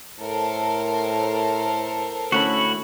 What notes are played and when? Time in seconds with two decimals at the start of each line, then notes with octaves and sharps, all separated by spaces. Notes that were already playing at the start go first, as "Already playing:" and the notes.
0.20 A2 A4 A#4 C5
2.32 D2 A3 C#4 E4 F#4 F#5 B5